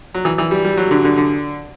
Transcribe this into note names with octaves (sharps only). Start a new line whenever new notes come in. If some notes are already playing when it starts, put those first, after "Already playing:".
F#3
E3
E3
G3
G3
F#3
D3
D3
D3